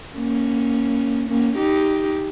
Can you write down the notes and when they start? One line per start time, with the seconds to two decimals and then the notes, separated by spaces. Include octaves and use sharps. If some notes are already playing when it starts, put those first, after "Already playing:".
0.16 A#3 C#4
1.29 A#3 C#4
1.57 D#4 G4